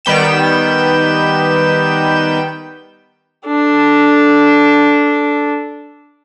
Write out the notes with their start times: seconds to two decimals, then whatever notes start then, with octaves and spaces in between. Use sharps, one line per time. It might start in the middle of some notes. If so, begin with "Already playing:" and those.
0.05 D#3 G3 B3 G5 E7
3.47 D4 A4